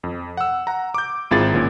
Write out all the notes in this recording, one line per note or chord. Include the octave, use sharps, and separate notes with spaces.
F2
F#5 E6
F#5 A#5
D6 G6
G#1 C4 E4 F4 G#4 A6
G#1 A#2 C#4